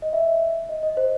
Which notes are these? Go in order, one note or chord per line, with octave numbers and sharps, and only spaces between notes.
D#5
E5
D#5
D#5
C5